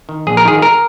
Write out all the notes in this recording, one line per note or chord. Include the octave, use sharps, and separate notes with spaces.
D#3
A#1 G#4
A#4
G#2 D#3 G#4
A#4